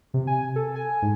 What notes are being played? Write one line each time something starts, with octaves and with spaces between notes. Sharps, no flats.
C3
G#5
A4
G#5
G#2